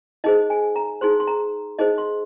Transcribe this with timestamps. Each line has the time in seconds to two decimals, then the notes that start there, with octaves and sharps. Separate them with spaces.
0.24 D#4 G#4 C5 D#5
0.50 G#5
0.76 A#5
1.01 D#4 G#4 C5 C6
1.20 C6
1.27 A#5
1.79 D#4 G#4 C5 D#5
1.98 C6